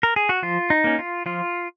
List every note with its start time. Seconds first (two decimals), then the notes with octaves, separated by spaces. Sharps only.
0.03 A#4
0.16 G#4
0.29 F#4
0.43 F3 F4
0.70 D#4
0.84 A#3 C#4
0.99 F4
1.26 F3 F4